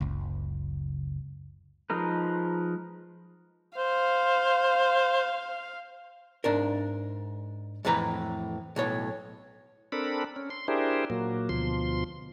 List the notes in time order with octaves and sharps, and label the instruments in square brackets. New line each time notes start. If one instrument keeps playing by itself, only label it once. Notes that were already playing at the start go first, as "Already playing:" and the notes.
[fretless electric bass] F#1 C#2
[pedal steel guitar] F3 G#3 D#4 A#4 B4
[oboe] C5 [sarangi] F5
[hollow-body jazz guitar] G#2 D4 A#4
F2 A2 E3 B4 A#5
B1 A2 C#5
[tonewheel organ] C4 D4 A4 A#4 B5
C#4
C6
D4 E4 G4 G#4 A#4 C5
A#2 F#3 A#3
D2 B2 F3 C6